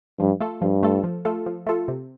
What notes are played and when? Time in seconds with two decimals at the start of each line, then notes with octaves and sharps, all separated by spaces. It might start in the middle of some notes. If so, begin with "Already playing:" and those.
0.19 G2 F3
0.40 A3 F4 A4
0.62 G2 F3
0.83 A3 F4 A4
1.04 F3
1.25 A3 F4 A4
1.46 F3
1.67 A3 F4 A4
1.88 C3